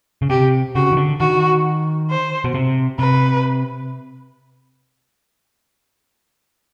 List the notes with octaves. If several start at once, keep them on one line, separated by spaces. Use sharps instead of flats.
C#3
C3 G4
C#3 F#4
D#3
D3
D#3 F#4
C5
B2
C3
C3 B4